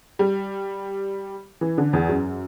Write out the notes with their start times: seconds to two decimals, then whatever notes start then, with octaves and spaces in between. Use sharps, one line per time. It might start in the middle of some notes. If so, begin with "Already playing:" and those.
0.19 G3
1.61 E3
1.78 D3
1.93 E2
2.09 F#2